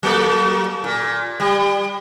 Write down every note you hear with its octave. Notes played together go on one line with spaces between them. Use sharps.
F#3 A#3 A4
A#2
G3